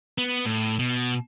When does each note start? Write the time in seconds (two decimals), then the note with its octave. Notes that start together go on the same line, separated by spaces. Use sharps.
0.18 B3
0.45 A2
0.79 B2